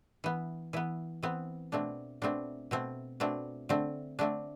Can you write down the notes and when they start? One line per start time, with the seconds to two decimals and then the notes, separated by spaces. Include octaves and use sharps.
0.24 E3 B3
0.73 E3 B3 E4
1.23 E3 B3 C4
1.72 B2 A3 C4 D4
2.22 B2 A3 C4 D4
2.71 B2 A3 C4
3.20 B2 A3 C4 D4
3.69 D3 A3 C4
4.19 D3 A3 C4 D4